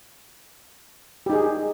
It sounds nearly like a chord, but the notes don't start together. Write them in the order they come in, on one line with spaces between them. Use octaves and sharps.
G4 D#4 G#4